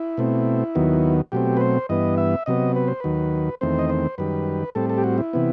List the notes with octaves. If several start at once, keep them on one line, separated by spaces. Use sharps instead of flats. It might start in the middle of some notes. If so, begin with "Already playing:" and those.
Already playing: E4
B2 A3 C4
D#2 D#3 F#3 B3
B2 F#3 A3 C4 G4
B4
C5
G2 E3 B3 D#5
E5
C3 F#3 B3 D#5
B4
C5
D#2 D#3 F#3 B4
E2 D#3 A3 C4 C5
D#5
C5
F#2 D#3 G3 B4
A2 G3 C4 A4
A4
G4
F#4
E4
C3 E3 B3